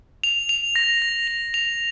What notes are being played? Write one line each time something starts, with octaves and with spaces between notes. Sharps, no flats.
F7
F7
A#6
A#6
F7
F7